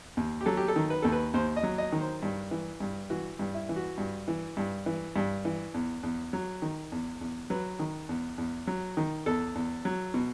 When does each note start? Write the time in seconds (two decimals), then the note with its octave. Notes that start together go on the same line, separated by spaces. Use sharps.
0.17 D#2
0.41 G4
0.46 F#3 A4
0.57 G4
0.68 A4
0.76 D#3
0.90 B4
1.02 D#2 A4
1.12 B4
1.34 D#2 C5
1.56 D#5
1.63 F#3
1.78 D#5
1.92 D#3
2.00 C5
2.23 G2
2.51 E3
2.80 G2
3.10 E3 F#4
3.39 G2
3.54 E4
3.69 E3
3.76 F#4
3.98 G2
4.28 E3
4.57 G2
4.86 E3
5.16 G2
5.45 E3
5.74 E2
6.03 E2
6.33 F#3
6.62 D#3
6.92 E2
7.21 E2
7.50 F#3 B4
7.79 D#3
8.09 E2
8.38 E2
8.67 F#3
8.97 D#3
9.26 E2 A4
9.55 E2
9.85 F#3
10.14 B2